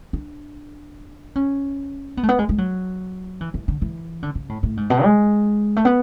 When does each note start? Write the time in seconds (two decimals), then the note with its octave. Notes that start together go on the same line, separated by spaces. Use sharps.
0.13 D4
1.36 C#4
2.17 B3
2.23 A3
2.29 B3
2.39 G#3
2.49 G#3
2.58 F#3
3.41 E3
3.54 E3
3.68 D3
3.82 E3
4.23 D3
4.35 C#3
4.49 A2
4.63 A2
4.77 G#2
4.90 B2
5.04 G#3
5.76 A3
5.85 B3